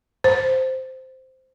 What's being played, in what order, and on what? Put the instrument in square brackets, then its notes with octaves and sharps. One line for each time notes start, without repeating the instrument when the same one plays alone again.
[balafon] C5